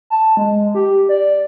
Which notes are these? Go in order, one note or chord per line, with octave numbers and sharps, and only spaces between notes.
A5
G#3
G4
D5